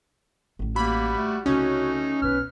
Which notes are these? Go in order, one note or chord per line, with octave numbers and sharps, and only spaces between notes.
A1 A2
G3 A#3 F#4 B5
A3
C2 C#3 A3 C#4 D#4 F#4
B1 D#4 B4 F6